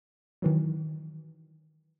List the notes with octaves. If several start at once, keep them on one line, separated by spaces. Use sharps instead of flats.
D#3 E3 F#3